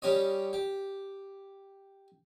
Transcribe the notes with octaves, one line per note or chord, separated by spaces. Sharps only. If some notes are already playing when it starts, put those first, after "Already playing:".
G3 C#4 G4 C#5 D#5
G4